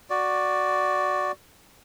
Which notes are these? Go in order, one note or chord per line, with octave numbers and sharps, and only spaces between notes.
F#4 D5